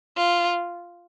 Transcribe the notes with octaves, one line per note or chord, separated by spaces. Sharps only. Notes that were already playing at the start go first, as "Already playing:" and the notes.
F4